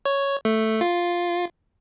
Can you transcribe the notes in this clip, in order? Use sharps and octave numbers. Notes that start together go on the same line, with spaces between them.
C#5
A3
F4